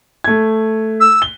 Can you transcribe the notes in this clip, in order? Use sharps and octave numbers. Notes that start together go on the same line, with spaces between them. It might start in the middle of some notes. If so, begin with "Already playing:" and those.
A3 G#6
E6
G7